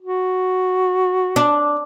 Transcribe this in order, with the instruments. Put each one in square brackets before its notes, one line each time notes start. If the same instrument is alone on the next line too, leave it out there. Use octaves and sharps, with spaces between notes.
[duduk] F#4
[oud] D4